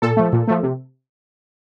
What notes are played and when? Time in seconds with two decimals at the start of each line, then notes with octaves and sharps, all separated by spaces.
0.02 A#2 A4
0.17 F3 A3
0.33 A#2
0.48 F3 A3
0.63 C3